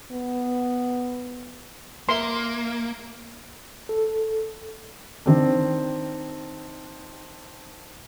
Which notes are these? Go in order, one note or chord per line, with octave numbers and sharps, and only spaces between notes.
B3
A#3 A#4 E5 C6
A4
D#3 C4 D4